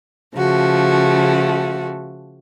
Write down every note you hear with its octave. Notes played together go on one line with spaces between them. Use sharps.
C#3 F3 A3 F#4